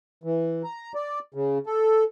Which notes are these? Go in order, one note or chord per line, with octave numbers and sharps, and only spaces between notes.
E3
A#5
D5
C#3
A4